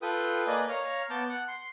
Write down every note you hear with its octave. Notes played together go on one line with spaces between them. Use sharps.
F4 A4 B4 G5 D#6
A#3 B4 D5 D#5 G#5
C#5 F5 A#5
B3 A5 D6 G6
F#5
C6